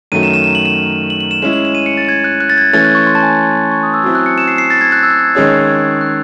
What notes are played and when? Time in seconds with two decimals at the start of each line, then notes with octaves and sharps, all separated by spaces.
0.12 F#2 D#3 F#3 A3 D#7
0.23 E7
0.33 E7
0.44 E7
0.55 F#7
0.65 E7
1.10 F#7
1.21 F#7
1.31 E7
1.42 G#3 C#4 E4 E7
1.53 F#7
1.65 E7
1.75 D#7
1.86 C#7
1.97 A6
2.09 G#6
2.24 F#6
2.40 F#6
2.50 A6
2.58 G#6
2.73 E3 A3 C#4 A6
2.85 F#6
2.95 C#6
3.07 C6
3.15 A5
3.23 G#5
3.31 A5
3.71 C#6
3.83 D#6
3.94 E6
4.04 F#3 C4 E4 E6
4.15 F#6
4.26 C#7
4.38 E7
4.48 C7
4.58 C7
4.70 A6
4.81 G#6
4.92 F#6
5.03 E6
5.13 F#6
5.24 G#6
5.35 D#3 G#3 C#4 G#4 C#5 G#6
5.52 G#6
6.01 F#6